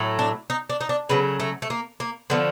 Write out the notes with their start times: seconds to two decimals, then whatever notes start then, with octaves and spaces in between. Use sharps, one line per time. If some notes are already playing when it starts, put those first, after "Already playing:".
Already playing: A2 F#3 A3
0.19 D4
0.50 D#4
0.70 D4
0.81 D#4
0.89 D4
1.09 C#3 F#3 A3 B3
1.40 A3
1.62 A3
1.70 A#3
2.00 A#3
2.30 D3 F3 A3 B3